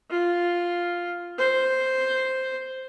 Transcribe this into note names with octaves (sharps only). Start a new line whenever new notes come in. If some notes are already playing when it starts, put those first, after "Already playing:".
F4
C5